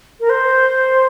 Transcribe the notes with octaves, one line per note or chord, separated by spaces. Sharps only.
A#4
C5